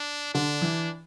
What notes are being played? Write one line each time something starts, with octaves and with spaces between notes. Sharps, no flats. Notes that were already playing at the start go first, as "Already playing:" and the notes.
Already playing: D4
D3 D4
E3